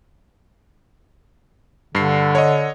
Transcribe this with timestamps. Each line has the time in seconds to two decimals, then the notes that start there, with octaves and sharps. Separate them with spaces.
1.95 G2 D3 C7
2.35 C#5 D#5